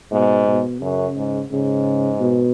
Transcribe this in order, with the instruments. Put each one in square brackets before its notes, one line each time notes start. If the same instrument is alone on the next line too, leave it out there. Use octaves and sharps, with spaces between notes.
[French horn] G#2 [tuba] B2
[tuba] B2
[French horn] F#2 [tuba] C#3
[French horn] G#2
[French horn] G#2 [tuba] C#3
[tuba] B2